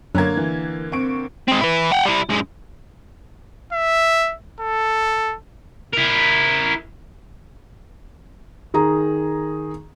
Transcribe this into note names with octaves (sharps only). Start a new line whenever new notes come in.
F#2 D3 A#3 C#5 A#5 G#6
E3
C4 C#6 D7
G#3 C4
E4 B4
F#5 G5
G3 E4
F#2 G#3
E5
A4
E4 A#4
D#3 G#4 A#5